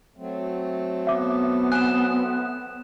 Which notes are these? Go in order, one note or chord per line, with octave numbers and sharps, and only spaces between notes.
F#3 A3 C4
B3 E5 D6
G#5 F#6 E7